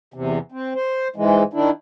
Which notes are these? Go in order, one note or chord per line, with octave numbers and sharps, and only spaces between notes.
E2 C3
C4
C5
G#2 E3 G#3
D#3 D4 E4